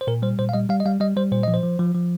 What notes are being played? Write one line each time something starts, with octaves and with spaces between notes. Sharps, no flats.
C5
A#2 A#4
G3 C5
A#2 C5
F5
G3 D#5
G3 F5
D#5
G3 F5
G3 D#5
G3 C5
A#2 C5
F3 D#5
C5
F3
F3
F3